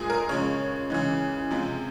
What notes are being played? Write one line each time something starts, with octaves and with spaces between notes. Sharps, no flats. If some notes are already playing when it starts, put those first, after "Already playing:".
Already playing: A#2 G#3 G#4
A#4
C#3 F3 G#3 C#5
C#3 E3 G#3
C3 F3 G#3